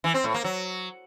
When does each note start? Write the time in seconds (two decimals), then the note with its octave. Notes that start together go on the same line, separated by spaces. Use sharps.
0.04 E3
0.14 C4
0.24 A2
0.34 A#3
0.44 F#3